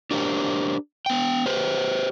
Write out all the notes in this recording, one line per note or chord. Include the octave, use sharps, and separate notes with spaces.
D4 G4 A#4 C5
B3 G5
G4 B4 C5